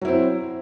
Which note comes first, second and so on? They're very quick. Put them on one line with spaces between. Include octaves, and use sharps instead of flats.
F#3 E4 C4